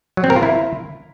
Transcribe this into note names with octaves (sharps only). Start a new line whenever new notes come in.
F#3
C4
A#4
F4
E4